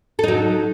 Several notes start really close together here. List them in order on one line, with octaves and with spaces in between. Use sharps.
A4 D#4 F#3